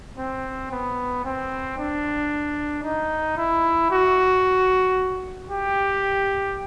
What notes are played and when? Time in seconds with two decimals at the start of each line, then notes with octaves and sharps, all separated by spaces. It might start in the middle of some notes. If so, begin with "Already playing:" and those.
0.19 C4
0.72 B3
1.25 C4
1.78 D4
2.84 D#4
3.38 E4
3.91 F#4
5.50 G4